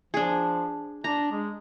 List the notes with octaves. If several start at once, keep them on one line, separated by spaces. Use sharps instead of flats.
F3 D4 G#4
D4 A#5
G#3